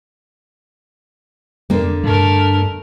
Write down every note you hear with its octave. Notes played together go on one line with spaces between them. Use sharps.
F2 D3 A#3
G2 A3 A#4